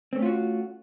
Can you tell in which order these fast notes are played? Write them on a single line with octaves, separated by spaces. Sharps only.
C4 A3 C#4 F4 F#4